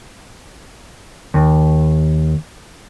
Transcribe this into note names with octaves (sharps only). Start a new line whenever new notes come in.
D#2